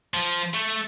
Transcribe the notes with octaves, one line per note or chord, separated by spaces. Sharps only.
F3
A3